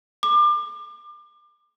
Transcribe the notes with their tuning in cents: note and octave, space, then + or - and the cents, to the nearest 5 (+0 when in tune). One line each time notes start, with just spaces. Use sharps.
D6 +30